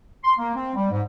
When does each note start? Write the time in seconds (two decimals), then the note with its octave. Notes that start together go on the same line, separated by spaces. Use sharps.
0.24 C6
0.38 A#3
0.55 C4
0.75 G3
0.91 G#2